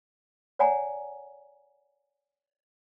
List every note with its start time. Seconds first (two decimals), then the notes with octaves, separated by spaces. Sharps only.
0.59 C#5 D5 F#5 G#5 A#5